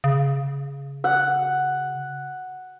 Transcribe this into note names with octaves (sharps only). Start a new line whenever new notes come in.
C#3
F#5